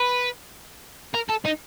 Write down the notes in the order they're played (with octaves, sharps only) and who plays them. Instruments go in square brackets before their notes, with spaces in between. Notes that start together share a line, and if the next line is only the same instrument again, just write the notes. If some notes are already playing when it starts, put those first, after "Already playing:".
Already playing: [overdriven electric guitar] B4
A#4
A4
D#4